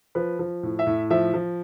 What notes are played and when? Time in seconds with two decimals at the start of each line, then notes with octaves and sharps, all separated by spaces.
0.15 F3 B4
0.39 F3
0.63 A2
0.79 E5
0.87 A2
1.10 F3 E5
1.34 F3